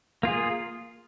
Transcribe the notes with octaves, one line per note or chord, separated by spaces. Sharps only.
A#3 F4 G#4